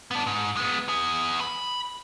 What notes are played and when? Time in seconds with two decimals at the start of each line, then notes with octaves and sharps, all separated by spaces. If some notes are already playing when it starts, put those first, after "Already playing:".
0.11 B3 D4
0.26 G#2
0.57 G#3 B3
0.88 B3 G#4
1.40 B5